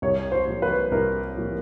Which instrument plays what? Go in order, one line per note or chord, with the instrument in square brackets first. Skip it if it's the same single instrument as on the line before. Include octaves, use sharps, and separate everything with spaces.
[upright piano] C2 C#5
C5
A#2 F3
B4
C2 A#4
A#2 F3